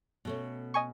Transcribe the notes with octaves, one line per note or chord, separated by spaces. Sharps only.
B2 A3 C#4
D#5 G#5 C#6